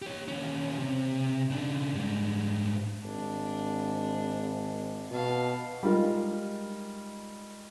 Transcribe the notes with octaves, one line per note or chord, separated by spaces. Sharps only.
G4 C#5
D#2 C#4
C3
C#3 D4
G#2 G3
G#1 D4
B2 F5 A5
G3 G#3 D#4 F4 A#4